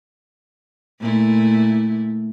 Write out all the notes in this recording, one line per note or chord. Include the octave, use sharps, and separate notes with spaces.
A#2 A3 E4